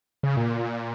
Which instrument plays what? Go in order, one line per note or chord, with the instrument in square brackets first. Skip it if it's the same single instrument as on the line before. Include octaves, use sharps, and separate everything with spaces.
[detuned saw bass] C#3
A#2